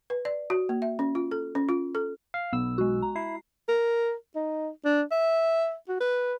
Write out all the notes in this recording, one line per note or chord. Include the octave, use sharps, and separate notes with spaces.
B4
D5
F#4
A#3
E5
C#4
F4
A4
C#4
F4
A4
F5
B1 B3 E6
G#3 F#4
A#5
E4 C7
A#4
D#4
D4
E5
F#4
B4